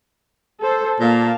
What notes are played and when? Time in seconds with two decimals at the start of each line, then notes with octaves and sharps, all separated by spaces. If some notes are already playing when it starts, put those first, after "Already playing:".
0.60 A4 C5
1.00 A#2 A#3 F5 A5